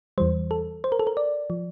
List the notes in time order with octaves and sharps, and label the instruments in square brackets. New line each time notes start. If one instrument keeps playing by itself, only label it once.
[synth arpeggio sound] E2 E3 G3 C5
A4
C5
A#4
A4
A#4
D5
F3